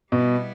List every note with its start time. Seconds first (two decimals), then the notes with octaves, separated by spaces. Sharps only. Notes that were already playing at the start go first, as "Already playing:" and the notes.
0.12 B2 G3 B3 E4